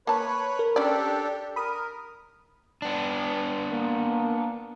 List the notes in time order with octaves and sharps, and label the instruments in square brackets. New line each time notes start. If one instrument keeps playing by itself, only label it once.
[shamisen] A#3 A5 [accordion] B4 C#5 B5
[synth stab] A#4
[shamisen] C#4 D5 [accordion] D4 G4 A4
[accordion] A#4 [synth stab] B5 D#6
[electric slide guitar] B3 D4
[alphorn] A#3